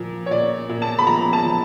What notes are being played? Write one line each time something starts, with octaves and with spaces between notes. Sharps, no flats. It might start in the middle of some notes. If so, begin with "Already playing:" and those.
Already playing: A#2 F3
C#5
A#2 D5
A#2
A5
B5
F3 A#5
A5
F3